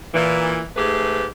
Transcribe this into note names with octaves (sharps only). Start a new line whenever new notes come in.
A#2 E3
G#2 A3 G4 G#4 B4